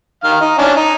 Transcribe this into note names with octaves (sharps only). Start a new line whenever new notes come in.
D#3 F5
D#4
C#4 D4
D#4